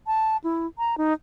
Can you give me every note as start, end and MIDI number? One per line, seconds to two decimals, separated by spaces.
0.07 0.37 81
0.44 0.67 64
0.78 0.98 82
0.98 1.13 63